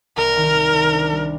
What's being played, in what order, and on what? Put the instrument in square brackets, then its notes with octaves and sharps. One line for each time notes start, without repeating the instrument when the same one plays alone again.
[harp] C2 [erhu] A#4
[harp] D#3
C3
C2
D4
G3